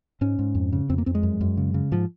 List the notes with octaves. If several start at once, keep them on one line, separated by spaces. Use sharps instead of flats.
G#2 C#4
G#2
F2
C#3
F2 C4
A#3
F2 C4
G#3
F#2
F#2
C#3
C#3
G#2 F3